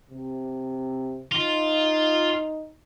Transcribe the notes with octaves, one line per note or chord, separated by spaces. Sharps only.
C3
D#4 F4